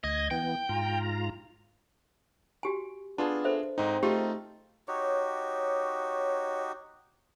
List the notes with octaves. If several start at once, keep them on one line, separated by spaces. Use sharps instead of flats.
D2 D#5 G#6
E3 B3 G5
G#2 F4 A#5
F#4 G4 G#5
B3 D4 F4 G#4 A5
A4 C5 E5
G#2 C4 D#4
A3 D#4 F4 G4 G#4
D#4 F#4 G4 C#5